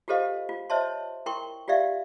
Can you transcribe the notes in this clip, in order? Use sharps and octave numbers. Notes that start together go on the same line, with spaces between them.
F4 G4 A4 C5 D#5 F5
F4
C5 C#5 D#5 E5 A5 C6
E4 A#4 G5 C6 C#6
F4 G4 D5 E5 F5